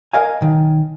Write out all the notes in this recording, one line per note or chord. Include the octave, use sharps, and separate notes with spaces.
A#4 D#5 F5 G#5
B1 D#3